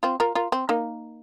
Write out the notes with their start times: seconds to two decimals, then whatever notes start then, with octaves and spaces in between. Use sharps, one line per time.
0.03 C4 F4
0.20 F4 A#4
0.35 F4 A#4
0.52 C4
0.69 A#3 D#4